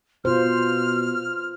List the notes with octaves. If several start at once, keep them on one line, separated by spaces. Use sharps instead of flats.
B2 F4 C5 F6